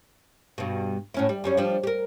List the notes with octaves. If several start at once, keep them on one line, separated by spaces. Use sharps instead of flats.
G2 B2
A2 C#4 E4
G3
F#2 G3 C#4
F3 G3 D4
G4 A#4